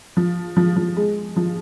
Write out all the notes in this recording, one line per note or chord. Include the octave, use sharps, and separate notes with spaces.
F3
F3
F3
G#3
F3